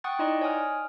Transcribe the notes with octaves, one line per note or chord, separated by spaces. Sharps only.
F#5 G5 C#6 D#6 F#6 A6
D#4 E4 D5 D#5 C6
C#5 G#5 D#6 F6